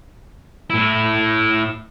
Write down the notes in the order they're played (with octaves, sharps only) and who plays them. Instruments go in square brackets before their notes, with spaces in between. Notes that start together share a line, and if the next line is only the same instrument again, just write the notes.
[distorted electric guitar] A2 E4